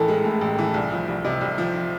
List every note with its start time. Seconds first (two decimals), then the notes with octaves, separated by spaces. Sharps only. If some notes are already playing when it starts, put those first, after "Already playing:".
Already playing: A1 E3 A4 A#4
0.08 G#3
0.24 A2
0.41 A1
0.59 E3
0.74 C2
0.91 F3
1.08 C2
1.24 C3 D#5
1.41 C2
1.58 F3